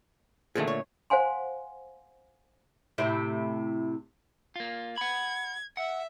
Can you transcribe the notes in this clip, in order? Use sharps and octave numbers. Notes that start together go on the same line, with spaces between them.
A#2 D3 D#3 F3 A3 G#4
C#5
C5 F5 F#5 G#5 C6
A2 C3 E4
A#3 F4
F#5 B5 G#6
E5 F#5